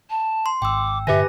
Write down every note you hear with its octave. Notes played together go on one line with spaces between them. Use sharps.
A5
C6
G#1 G5 D6 E6
G2 A#2 D3 G4 B4 E5 G#5 A#6